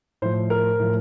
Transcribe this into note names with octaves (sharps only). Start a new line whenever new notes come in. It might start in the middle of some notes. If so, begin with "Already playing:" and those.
A2 F3 C5
A#4
A2 F3